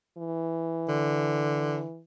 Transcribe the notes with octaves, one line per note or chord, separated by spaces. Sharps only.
E3
D3